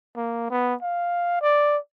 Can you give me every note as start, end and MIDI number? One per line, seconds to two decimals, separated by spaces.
0.16 0.46 58
0.51 0.75 59
0.82 1.39 77
1.42 1.78 74